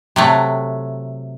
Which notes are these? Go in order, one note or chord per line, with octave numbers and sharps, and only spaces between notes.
C3 F#3 A3